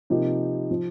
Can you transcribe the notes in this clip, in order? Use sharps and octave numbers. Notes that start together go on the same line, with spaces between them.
C3 F3 A#3 D#4 G4
F3